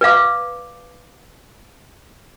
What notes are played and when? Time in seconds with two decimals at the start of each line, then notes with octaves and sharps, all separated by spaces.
0.01 B4 D5 F5 D6